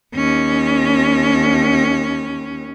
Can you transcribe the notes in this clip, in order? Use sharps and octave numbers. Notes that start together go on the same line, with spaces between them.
D#2 C#4